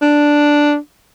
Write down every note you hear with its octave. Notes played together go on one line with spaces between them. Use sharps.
D4